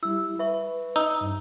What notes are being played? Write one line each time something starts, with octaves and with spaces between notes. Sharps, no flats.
G3 E4 E6
B4 E5 C#6
D#4 E6
G2